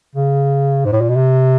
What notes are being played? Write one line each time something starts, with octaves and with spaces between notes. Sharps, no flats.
C#3
G#2
A2
A#2
B2
C3